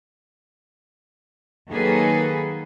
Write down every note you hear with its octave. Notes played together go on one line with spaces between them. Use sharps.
D#3 F#3 A#3 G#4 A4 B4